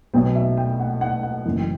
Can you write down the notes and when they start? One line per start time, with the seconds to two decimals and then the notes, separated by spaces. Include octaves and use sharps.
0.14 B1 B2 F#3 B3 G5
0.35 E5
0.57 G5
0.80 F#5
1.01 F#5
1.23 F#5
1.45 F#1 F#2 E3
1.59 G5